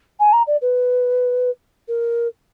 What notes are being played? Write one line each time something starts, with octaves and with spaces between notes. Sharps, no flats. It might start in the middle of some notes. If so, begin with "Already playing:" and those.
G#5
A#5
D5
B4
A#4